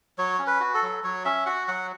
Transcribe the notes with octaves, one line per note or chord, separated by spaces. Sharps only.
F#3 C#5
C#4
B4
F#4
A4
F#3
F#3 C#5
C#4 E5
F#4 F#5
F#3 F#5